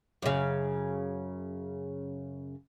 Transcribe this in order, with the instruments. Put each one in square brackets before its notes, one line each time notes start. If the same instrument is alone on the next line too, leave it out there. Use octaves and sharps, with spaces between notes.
[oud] F#2 C#3